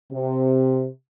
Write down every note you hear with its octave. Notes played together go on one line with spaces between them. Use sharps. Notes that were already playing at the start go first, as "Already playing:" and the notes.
C3